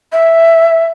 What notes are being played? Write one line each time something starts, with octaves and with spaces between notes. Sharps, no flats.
E5